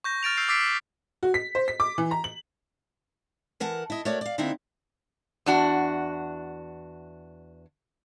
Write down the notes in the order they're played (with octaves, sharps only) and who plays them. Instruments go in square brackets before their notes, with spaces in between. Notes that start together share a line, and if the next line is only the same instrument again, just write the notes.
[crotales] C#6 G6 A#6
F6 A6 D7 F7
E6 F6 G6 C7
D6 E6 A6 B6 C7 D7
B6
[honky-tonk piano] F#4
B6
C5
B6
D6
E3
A#5
F#7
[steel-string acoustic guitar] E3 A#4 F#5 A5
E4 D#5
A3 F#4 A#4 C#5 D5
D5 F5
D3 A#3 C4 D#4 E4
[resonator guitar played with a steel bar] E2 D4 F#4